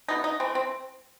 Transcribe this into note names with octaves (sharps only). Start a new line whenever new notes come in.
B2 A3 D#4
D#4
E3 A3 C4
C4